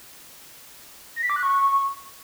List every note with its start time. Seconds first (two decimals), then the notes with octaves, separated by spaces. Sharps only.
1.16 A#6
1.23 B6
1.30 D6
1.36 F#6
1.43 C#6